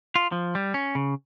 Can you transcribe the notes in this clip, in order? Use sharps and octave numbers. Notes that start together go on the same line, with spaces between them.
F4
F3
G3
C#4
C#3